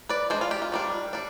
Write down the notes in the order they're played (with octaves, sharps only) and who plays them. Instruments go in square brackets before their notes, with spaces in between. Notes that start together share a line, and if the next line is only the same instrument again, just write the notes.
[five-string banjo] B4 D5
G#3 D4 G#4 C5
F4
G4
F4
D#3 G3 D4
G3 D4